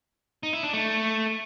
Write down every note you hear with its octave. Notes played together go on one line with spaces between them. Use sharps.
D#4
E4
D4
A3